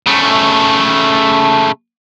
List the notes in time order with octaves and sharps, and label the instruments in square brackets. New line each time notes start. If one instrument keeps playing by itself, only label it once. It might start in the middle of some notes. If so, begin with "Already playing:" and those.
[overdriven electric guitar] C#3 A3